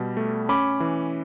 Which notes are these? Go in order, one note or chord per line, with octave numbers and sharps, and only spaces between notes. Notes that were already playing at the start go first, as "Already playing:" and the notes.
Already playing: B2 G3
A3
C#4 B5 D6
E3